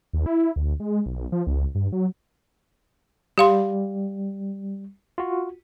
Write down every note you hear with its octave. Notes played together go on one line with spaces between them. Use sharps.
D#2
E4
D2
G#3
B1
F3
C#2
G2
F#3
G3 G4 F5 C6
F4 F#4